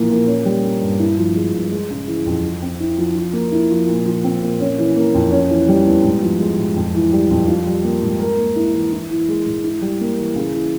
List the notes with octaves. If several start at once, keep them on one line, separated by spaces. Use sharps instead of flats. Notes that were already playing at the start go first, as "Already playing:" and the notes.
Already playing: A#2 E3 F3 A#3
A#2
C#4
G3
A#3
G2
E4
F3
G#3
G2
G#3
C#3
E3
F2
F3
C4
E4
F3
F3
A#3
E4
F3
A#2
F3
C4
A#2
C#4
E3
A#3
F2
C#4
E3
G3
E2
G#2
F3
G#3
G#2
F2
E3
G3
F2
F4
G3
A#3
G#2
A#4
A#3
E4
E3
E4
E3
G#3
G#2
E4
G3
A#3
E3
C#3
E3